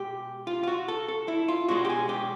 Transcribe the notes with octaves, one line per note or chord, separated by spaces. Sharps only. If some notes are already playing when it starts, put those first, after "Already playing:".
Already playing: B2 G#3 G4
F4
F4
F#4
A4
A4
E4
F4
B2 G#3 F#4
G4
G#4
G4